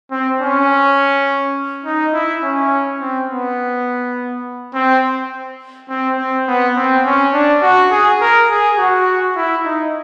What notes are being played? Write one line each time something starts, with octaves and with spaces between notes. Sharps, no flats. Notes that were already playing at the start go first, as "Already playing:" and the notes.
C4
C#4
D#4
E4
C#4
C4
B3
C4
C4
C4
B3
C4
C#4
D4
F#4
G#4
A#4
G#4
F#4
E4
D#4